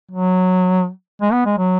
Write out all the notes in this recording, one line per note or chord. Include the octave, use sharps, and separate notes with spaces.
F#3
G#3
B3
G#3
F#3